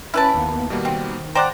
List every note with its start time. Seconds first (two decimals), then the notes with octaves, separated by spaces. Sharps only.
0.14 C#4 E4 B4 A5 B5 D7
0.34 D#2 A#3 B3
0.70 B2 D#3 G3 A#3
0.85 C4
1.35 C5 D5 F#5 G5 A#5 A#6